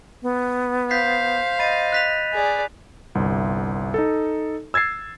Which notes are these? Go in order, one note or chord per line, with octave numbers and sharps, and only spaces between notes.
B3
C5 F5 G6 B6 C7
D#5 B5 A6 D#7
F#6 B6 F7
G#4 D5
G1 C2
D#4 A4
E6 G#6 A6 C7